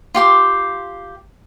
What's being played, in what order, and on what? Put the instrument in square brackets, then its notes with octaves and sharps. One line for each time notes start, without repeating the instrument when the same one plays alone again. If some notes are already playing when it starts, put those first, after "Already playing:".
[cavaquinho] F4 G4 C6 D6